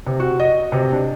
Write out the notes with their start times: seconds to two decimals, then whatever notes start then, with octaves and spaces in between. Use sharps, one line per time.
0.07 C3
0.20 F#4
0.40 D#5
0.72 C3
0.92 D4